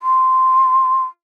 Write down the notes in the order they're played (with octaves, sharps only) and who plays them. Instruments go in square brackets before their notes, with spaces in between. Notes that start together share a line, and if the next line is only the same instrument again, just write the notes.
[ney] C6